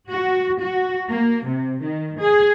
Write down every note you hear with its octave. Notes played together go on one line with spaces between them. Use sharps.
F#4
F#4
A#3
C3
D#3
G#4